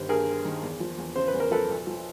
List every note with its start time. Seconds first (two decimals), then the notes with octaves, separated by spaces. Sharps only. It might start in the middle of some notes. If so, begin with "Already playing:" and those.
Already playing: G1 D#3 G3 C5
0.09 G2 G#4 A#4
0.27 G3
0.45 D#3
0.63 E2
0.80 F3
0.98 E2
1.16 C#3 C5
1.28 B4
1.34 E2
1.40 A#4
1.51 F3 A4 B4
1.69 B1
1.87 F3